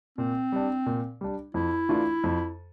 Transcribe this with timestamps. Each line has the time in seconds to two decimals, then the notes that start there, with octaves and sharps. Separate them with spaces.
0.18 A#2 C4
0.52 G3 D4
0.86 A#2
1.21 G3 D4
1.54 F2 E4
1.89 E3 A3 D4 F4
2.24 F2